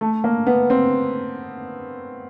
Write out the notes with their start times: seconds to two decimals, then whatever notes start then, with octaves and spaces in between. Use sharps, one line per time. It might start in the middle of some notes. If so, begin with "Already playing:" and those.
0.01 A3
0.24 A#3
0.47 B3
0.70 C4